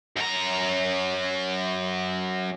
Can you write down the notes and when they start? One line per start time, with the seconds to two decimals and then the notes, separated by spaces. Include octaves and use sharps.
0.17 F#2 A#5